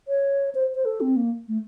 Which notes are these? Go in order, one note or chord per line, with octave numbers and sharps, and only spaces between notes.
C#5
C5
C5
A4
C4
A#3
A3